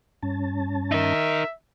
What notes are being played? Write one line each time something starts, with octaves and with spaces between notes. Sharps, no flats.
G2 C#4 A5
D#4 A#4 E5